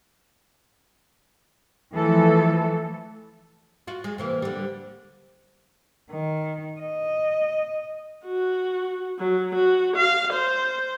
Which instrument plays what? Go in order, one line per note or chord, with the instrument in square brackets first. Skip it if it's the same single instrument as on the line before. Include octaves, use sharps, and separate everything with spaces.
[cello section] E3 F3 A3 A4
[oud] F4 F#4
G#3
C3 E3 A#3
D3 G3
[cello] D#3
D#5
[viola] F#4
F#3
F#4
F5
C5